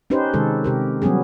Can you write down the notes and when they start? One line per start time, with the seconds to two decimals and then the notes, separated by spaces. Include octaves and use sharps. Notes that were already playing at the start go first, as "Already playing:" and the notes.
0.10 C#4 D#4 G4 B4 C5
0.34 C3 D#3 G#3 A4
0.64 C3 G4 A#4
1.02 F#3 G3 B3 C#4 G#4